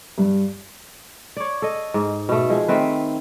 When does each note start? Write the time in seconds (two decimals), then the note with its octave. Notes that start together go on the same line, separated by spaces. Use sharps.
0.18 G2
1.37 C#5 D5
1.62 A4 D#5
1.94 G#2
2.29 B2 A3
2.50 F3 G#3
2.68 D#3 A3 C4 B4